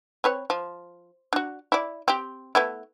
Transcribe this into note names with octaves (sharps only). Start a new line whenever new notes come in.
C4 B4 C#5
F3
D4 F#4
E4 D5
C4 G4
A3 B3 E4